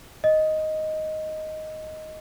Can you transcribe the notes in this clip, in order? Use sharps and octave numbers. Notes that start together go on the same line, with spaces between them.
D#5